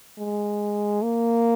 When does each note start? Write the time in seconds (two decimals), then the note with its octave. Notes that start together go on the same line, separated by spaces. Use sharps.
0.19 G#3
1.03 A#3